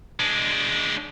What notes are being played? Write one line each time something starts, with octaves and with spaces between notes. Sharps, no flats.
G#3 D4